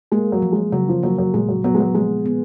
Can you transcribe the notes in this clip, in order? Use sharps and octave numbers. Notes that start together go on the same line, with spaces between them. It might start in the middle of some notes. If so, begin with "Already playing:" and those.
G#3 A#3
F#3
F3
G#3
C#3 F#3
F3
F#3 A#3
F#3
A#2 G#3
F#3
F#3 B3
G#3
F#3
F3 G#3
B3